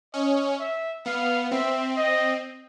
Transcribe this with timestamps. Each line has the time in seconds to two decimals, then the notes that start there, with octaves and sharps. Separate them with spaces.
0.14 C#4 D#5
0.60 E5
1.06 B3 F5
1.51 C4 E5
1.96 D#5